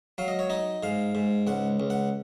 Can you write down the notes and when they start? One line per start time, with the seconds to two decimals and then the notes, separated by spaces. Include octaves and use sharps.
0.18 F#3 F5
0.28 D#5
0.39 C#5
0.50 D#4 D#5
0.83 G#2 F5
1.15 G#2
1.47 C#2 F#5
1.80 C#2
1.90 F#5